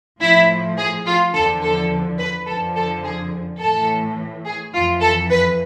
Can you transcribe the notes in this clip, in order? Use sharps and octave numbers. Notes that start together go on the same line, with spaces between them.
A2 F3 E4
G#4
F4
E2 D3 F3 A4
A4
B4
F2 D3 F3 A4
A4
G#4
A2 E3 A4
G#4
F2 E3 F4
A4
B4